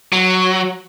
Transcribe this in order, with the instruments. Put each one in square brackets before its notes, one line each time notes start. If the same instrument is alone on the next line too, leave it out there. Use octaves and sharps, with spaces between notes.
[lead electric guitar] F#3